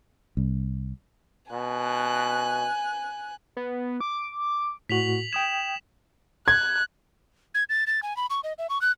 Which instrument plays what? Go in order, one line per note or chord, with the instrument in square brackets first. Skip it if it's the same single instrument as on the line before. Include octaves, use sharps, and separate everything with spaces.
[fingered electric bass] C2
[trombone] B2 [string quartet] G#5 F#6
[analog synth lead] B3
D6
[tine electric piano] A2 F#4 [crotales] B6 F7 F#7
[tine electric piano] G5 D#6 G#6 [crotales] E7
[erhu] F#6 [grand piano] G#6
[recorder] G#6
A6
A6
G#5
B5
C#6
D#5
E5
C#6
F#6